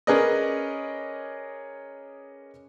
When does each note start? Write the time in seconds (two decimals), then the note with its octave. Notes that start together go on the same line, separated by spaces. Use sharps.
0.07 C#4 G#4 A#4 B4 D5 D#5